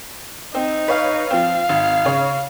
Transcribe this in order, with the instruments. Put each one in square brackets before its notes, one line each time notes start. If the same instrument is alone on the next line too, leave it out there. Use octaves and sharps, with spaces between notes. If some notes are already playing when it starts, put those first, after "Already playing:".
[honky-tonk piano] C4 [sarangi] D#4
[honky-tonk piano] B4 C#5 F5
[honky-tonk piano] F3 C4 [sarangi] F5
[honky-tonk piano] G#1
C#3 C#5